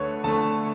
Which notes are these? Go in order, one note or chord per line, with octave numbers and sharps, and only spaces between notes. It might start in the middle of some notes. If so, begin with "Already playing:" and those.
Already playing: D2 D3 A3 A4 B4 C#5
D2 D3 A3 A5